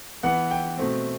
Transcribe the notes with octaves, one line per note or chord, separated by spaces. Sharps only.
E3 B3 F#5
G5
B2 A3 C4